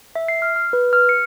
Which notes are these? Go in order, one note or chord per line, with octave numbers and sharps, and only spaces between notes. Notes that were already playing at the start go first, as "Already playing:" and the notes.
E5
C7
F6
F6
B4
F6
C#7